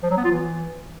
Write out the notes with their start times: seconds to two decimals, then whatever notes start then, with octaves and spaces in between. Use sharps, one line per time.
0.03 F3
0.10 F#3
0.17 B3
0.24 F4
0.31 E3